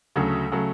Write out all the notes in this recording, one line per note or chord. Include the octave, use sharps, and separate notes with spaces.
D2 C#3 F#3 A3
C#3 F#3 A3